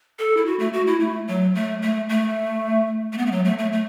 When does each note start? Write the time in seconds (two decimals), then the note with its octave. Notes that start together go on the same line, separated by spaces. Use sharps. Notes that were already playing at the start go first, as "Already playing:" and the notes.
0.19 A4
0.37 E4
0.46 F#4
0.59 A3
0.73 F#4
0.87 E4
1.00 A3
1.28 F#3
1.55 A3
1.82 A3
2.09 A3
3.13 A3
3.18 B3
3.26 A3
3.32 F#3
3.45 A3
3.59 A3
3.72 A3